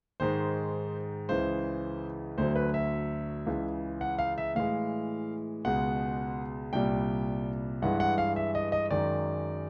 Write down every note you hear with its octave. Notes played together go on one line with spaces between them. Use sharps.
G#2 D#3 G#3 C5
C#2 C#3 E3 C5
D2 D3 F#3 C5
B4
E5
C#2 C#3 E3
F#5
F5
E5
A2 E3 G#3 F5
C#2 B2 G#3 F#5
C2 A#2 G3 G5
G2 E3 G#3 F#5
F#5
F5
E5
D#5
D#5
F#2 D#3 G#3 D5